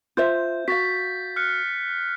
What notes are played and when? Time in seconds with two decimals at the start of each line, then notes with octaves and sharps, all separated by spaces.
0.17 F4 C5 E5 G6
0.68 F#4 F5 A6 B6
1.36 F6 F#6 C#7